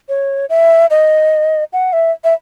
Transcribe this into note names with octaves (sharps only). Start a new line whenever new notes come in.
C#5
E5
D#5
F#5
E5
E5